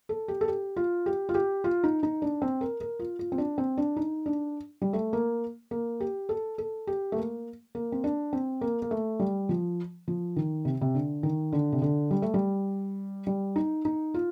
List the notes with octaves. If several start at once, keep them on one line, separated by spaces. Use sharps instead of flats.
A4
G4
A4
G4
F4
G4
F4
G4
F4
D#4
D#4
D4
C4
A#4
A#4
F4
F4
C4
D4
C4
D4
D#4
D4
G3
A3
A#3
A#3
G4
A4
A4
G4
A3
A#3
A#3
C4
D4
C4
A#3
A#3
A3
G3
F3
F3
D#3
C3
C3
D3
D#3
D3
C3
D3
G3
A3
G3
G3
D#4
D#4
F4